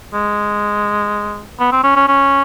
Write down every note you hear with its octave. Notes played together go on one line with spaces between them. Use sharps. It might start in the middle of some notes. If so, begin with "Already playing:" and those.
G#3
B3
C4
C#4
C#4
C#4